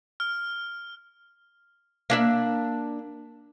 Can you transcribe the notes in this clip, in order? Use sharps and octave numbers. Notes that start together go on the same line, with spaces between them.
F6
A#3 D4 E5